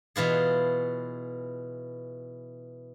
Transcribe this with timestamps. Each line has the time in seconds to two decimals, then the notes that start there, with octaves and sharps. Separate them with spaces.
0.16 B2 E3 F4 G#4